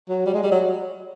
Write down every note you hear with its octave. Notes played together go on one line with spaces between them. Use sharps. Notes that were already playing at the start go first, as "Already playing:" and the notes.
F#3
G3
G#3
G3
F#3